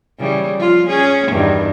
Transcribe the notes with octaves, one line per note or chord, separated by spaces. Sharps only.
C#3 E3 G3
F3 F4
C#4 G#4
E2 G2 D#3